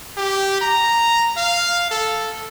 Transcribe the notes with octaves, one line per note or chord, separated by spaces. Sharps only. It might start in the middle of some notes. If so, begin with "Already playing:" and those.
G4
A#5
F5
A4